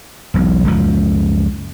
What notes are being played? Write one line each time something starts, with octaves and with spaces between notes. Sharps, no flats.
E1 B1
F#1 C#2 F3